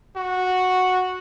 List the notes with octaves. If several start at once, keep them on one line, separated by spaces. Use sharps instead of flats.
F#4